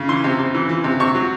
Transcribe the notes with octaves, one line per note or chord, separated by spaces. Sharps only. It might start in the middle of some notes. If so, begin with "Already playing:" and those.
Already playing: C#3
E3 C6
C3
C3
E3
E3
C3
C3 C#6
F#3